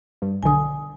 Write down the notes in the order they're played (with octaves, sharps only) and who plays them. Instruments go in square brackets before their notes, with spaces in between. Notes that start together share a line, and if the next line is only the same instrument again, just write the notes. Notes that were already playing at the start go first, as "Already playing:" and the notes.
[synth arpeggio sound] G2
[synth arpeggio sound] B1 D3 [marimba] G#5 D#6